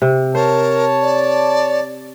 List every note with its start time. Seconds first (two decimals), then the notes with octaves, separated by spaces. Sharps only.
0.02 C3
0.35 A#4 C5 C#5 A5
1.02 D5